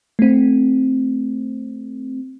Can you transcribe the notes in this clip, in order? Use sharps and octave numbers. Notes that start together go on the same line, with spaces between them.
A3 C4